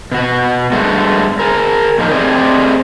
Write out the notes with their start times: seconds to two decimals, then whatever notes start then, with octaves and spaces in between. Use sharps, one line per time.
0.11 B2 F#4
0.72 G2 G#3 A3 B3 F#4
1.39 G#4 A#4
1.98 A#2 F3 D#4 G4 A#4
2.11 A3 C4 G4 G#4 D5 D#5